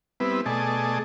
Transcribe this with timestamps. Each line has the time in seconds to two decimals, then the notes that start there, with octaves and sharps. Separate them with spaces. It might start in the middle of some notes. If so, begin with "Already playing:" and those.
0.20 G3 B3 C4 E4 B4
0.46 B2 A3 G#4 D5 D#5 A5